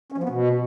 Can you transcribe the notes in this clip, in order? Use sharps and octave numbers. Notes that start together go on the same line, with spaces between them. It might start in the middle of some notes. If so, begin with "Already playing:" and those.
C#4
F3
B3
B2